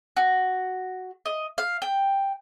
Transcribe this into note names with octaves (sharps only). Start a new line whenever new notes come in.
F#4
D#5
F5
G5